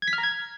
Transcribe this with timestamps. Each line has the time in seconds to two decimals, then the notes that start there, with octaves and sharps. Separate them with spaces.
0.02 G#6
0.08 B6
0.13 F6
0.18 A#5
0.23 G#6